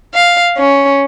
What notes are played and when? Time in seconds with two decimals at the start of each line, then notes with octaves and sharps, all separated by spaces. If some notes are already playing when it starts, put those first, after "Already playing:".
0.14 F5
0.57 C#4